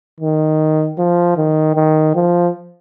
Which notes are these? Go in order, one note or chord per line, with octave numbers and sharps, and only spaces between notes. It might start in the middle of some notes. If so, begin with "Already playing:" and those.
D#3
F3
D#3
D#3
F3